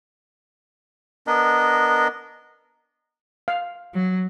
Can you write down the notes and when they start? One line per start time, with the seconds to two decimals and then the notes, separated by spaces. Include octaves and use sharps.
1.27 B3 D4 A#4 D#5
3.48 F5
3.94 F#3